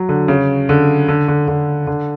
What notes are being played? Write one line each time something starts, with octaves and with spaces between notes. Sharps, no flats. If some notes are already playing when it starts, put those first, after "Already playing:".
Already playing: F#3
D3
C#3
D3
D3
D3
D3
D3